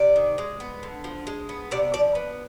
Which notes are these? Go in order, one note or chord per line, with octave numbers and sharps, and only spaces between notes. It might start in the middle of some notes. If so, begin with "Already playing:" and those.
Already playing: C3 D5
D#3
G#3
B3
D3
F3
G#3
B3
C3 D5
F3 D5
B3